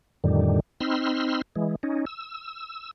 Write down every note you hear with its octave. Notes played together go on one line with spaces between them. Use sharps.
F2 A2 D3 D#3 G3
C4 D#4 B5 C6 E6 F6
E3 G#3
C#4 D#4
E6